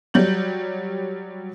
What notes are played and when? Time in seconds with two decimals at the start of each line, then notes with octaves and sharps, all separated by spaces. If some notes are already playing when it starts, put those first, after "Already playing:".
0.14 F#3 G3 G6 F#7